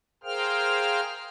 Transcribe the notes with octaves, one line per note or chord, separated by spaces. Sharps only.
G#4 A#4 C5 F5 G5 F6